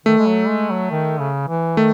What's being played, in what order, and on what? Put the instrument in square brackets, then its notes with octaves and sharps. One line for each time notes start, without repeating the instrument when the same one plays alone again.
[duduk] D#3 [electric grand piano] A3
[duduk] G#3
F#3
G#3
F#3
D#3
C#3
E3
[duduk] D#3 [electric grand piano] A3